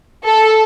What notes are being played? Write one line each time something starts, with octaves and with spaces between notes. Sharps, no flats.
A4